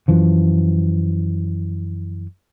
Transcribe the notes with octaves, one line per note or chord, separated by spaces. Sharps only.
F#2 E3 F3